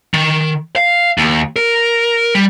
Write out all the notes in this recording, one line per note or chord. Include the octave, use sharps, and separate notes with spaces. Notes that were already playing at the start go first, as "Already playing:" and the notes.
D#3
F5
D#2
A#4
G3